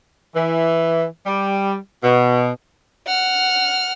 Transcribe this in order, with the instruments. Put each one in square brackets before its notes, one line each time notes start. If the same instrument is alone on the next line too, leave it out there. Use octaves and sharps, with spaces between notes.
[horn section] E3
G3
B2
[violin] F#5 F6